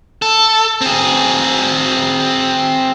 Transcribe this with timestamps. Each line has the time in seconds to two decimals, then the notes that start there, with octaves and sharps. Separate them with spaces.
0.22 A4
0.81 C4 G#4